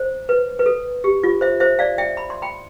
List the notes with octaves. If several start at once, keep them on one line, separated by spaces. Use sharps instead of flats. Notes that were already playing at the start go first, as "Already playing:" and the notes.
Already playing: C5
B4
B4
A4
G4
F4
C5 E5
C5 E5
D5 F5
E5 G5
B5
C6
G5 B5